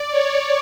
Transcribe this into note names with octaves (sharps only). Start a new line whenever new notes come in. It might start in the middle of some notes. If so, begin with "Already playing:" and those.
Already playing: D5
C#5